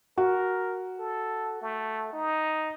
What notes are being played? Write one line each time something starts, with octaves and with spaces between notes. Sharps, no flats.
F#4 A#4
A4
A3
D#4